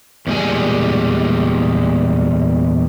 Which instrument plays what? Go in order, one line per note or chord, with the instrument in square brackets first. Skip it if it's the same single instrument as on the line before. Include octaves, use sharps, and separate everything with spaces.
[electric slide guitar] E2 A#2 G3 G#3 G#5